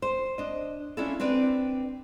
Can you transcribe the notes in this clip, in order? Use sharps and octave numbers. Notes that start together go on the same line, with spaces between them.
C5
D4 D#5
C#4 D4 E4 F4 A4
C4 D4 B4 D5